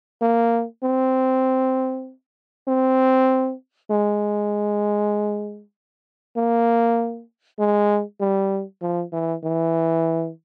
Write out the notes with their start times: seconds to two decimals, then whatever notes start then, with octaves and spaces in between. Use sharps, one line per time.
0.22 A#3
0.83 C4
2.68 C4
3.91 G#3
6.37 A#3
7.59 G#3
8.20 G3
8.82 F3
9.13 E3
9.44 E3